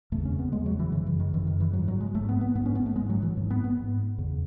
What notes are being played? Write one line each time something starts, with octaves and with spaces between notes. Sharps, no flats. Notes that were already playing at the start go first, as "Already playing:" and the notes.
E2 C#3 A3
C#4
B3
E2 C#3 G#3
F#3
E3
F#2 C#3 E3
E3
D#3
F#2 C#3 E3
D#3
E3
G#2 F#3
F#3
G#3
G#2 A3
B3
B3
G#2 B3
C#4
B3
A3
G#2 G#3
F#3
E3
G#2
B3
B3
G#2
E2 C#3